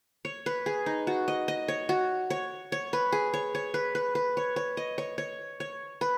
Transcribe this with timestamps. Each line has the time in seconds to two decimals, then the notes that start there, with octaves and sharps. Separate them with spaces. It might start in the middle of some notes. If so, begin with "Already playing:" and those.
0.25 C#5
0.46 B4
0.66 G#4
0.86 D#4
1.07 F#4
1.28 D#5
1.48 D#5
1.68 C#5
1.89 F#4
2.30 C#5
2.72 C#5
2.93 B4
3.12 G#4
3.34 C#5
3.55 C#5
3.74 B4
3.95 B4
4.15 B4
4.37 C#5
4.56 C#5
4.77 D#5
4.98 C#5
5.18 C#5
5.60 C#5
6.01 B4